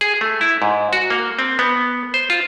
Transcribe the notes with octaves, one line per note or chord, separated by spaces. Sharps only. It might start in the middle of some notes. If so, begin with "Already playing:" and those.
G#4
A3
E4
G#2
F#4
A#3
C4
B3
C5
F4